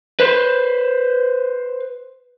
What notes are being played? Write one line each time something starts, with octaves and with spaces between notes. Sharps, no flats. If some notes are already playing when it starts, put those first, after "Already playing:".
B4 C5